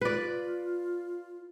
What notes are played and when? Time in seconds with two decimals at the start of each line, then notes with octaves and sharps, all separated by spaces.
0.01 F4 B4 D5